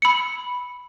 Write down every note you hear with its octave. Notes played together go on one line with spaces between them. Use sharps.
B5 C#7